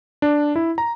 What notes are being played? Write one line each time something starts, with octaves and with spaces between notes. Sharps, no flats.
D4
E4
A#5